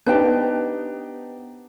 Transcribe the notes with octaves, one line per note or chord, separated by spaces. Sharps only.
B3 D4 D#4 G4 B4 C5 G5